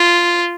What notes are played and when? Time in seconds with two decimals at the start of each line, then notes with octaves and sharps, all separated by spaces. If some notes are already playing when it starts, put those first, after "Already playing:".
Already playing: F4